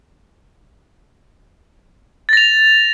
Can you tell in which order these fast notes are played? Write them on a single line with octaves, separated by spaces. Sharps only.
A6 A#6 F7